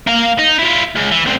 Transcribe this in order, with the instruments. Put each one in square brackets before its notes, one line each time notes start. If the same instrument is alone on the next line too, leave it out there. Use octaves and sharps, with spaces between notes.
[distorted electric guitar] A#3 F5
D#4
E4 F4
C#2
E3
D2 C3